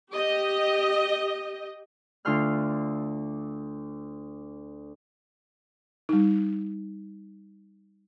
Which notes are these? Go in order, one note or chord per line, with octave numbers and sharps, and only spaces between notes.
G4 D#5
D2 D3 F4 C6 F6 F#6
G3 D#4